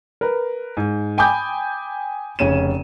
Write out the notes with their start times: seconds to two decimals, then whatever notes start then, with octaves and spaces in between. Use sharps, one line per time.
0.21 A#4 B4
0.77 G#2
1.18 G5 G#5 B5 D6 D#6 G6
2.39 F1 C#3 C#4 D#7 E7